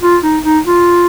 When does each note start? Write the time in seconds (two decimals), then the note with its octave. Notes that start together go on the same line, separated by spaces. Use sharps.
0.03 F4
0.23 D#4
0.44 D#4
0.66 F4